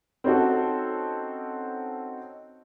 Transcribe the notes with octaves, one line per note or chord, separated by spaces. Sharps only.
C4 C#4 D#4 F#4 A4